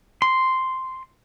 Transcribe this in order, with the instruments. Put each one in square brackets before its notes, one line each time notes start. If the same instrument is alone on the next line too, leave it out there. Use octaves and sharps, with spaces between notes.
[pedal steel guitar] C6